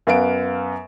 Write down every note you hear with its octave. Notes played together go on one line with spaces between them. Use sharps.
F#2 B3 F5 D7